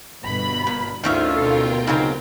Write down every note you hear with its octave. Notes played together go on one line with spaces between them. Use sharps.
G1 B2 B5
A#2
D2 G#2 D#3 C#4 F4 E5
B2 A4 A#4 G5
C#3 F#3 C4 D#4